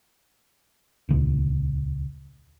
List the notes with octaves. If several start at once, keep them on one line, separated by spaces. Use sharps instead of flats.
D#1 C#2